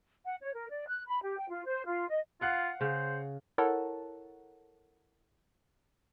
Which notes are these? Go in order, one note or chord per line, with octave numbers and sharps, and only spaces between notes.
F#5
C#5
A#4
D5
F#6
B5
G4
G5
F4
C5
F4
D#5
F4 F5 F#5 F#6
C#3 C5
E4 A4 A#4 C#5 F#5 A5